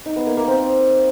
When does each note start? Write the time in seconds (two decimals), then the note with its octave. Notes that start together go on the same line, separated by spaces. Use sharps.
0.06 D#4
0.16 B3
0.27 A#3
0.37 A#3
0.47 C4